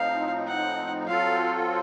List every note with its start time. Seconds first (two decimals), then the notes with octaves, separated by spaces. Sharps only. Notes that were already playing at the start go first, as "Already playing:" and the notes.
Already playing: A2 F3 C4 D#4 F5
0.48 F#5
1.07 F#3 C4 F4 A4 F5